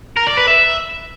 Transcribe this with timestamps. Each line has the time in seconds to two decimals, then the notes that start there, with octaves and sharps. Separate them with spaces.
0.17 A#4
0.27 D5
0.37 B4
0.48 E5